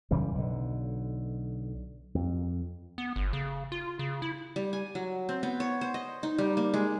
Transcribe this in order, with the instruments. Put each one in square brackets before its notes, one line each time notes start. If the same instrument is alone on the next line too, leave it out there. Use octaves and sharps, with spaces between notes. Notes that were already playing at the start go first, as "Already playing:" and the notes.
[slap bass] F#2 C#3 E3 G3
B1 D3
F2
[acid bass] B3
G1
C#3
F4
C#3
E4
[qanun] G3
G#5
F#3
C4
B3
C#5
C5
D#5
D#4
G3
A#3
G#3